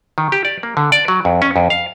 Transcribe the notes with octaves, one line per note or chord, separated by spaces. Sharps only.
D#3
G4
D5
A#3
D3
D5
F#3
F2
C#4
F2
F5